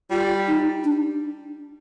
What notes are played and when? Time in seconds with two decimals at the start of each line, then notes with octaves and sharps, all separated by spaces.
0.10 G3 F4
0.47 D#4
0.84 D4